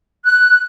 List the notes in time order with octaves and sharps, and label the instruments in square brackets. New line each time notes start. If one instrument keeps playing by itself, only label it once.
[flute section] F#6